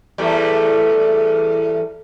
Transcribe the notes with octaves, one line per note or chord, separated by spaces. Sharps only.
E2 G3 A3